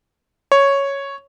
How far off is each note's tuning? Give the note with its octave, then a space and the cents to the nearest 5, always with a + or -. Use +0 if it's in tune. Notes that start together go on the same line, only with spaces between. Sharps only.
C#5 +0